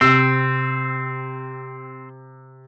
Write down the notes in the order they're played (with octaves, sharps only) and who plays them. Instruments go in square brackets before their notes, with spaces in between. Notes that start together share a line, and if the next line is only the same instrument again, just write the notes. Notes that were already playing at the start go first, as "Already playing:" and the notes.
[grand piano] C3 E6 [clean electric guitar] C4